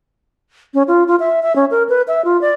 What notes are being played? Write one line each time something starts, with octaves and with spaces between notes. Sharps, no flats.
C#4
F4
F4
E5
E5
C#4
A#4
B4
E5
F4
D5